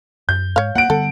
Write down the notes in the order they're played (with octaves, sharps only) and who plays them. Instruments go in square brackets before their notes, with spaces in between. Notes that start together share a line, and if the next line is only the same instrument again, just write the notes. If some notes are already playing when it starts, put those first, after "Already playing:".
[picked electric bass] F#2 [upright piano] G6
[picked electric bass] G#2 [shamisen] C#5 F5
[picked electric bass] A#3 [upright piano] F#5 D7
[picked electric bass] D3 G3 B3 [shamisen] A4